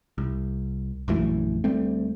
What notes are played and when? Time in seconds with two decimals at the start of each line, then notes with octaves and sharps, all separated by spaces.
0.18 C2
1.08 A#1 F#2 E3 A3
1.64 D2 G3 A3 C4